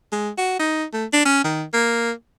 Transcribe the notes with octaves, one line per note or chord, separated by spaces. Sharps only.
G#3
F#4
D#4
A3
D4
C#4
D#3
A#3